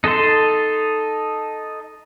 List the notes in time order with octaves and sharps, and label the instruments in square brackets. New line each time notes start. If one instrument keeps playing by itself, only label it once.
[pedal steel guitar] D#4 A4 A5 C6